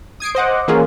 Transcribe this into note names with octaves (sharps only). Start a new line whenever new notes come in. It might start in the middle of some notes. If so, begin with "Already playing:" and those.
D#6 G#6 C7 D7
C5 D#5 F#5 D6
E3 A#3 C#4 F4 G#4